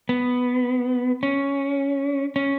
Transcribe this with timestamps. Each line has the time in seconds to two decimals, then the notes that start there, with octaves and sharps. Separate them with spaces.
0.09 B3
1.23 C#4
2.36 C#4